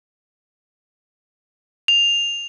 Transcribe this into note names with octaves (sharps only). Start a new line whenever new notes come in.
F7